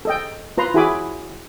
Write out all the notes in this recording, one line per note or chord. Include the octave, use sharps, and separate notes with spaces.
A4 D#5 G5
F4 B4 A#5 C6
E4 F#4 G#4 G#5 B5 D6